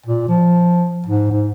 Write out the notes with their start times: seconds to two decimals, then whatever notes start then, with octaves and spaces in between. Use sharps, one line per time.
0.06 A#2
0.29 F3
1.07 G#2
1.31 G#2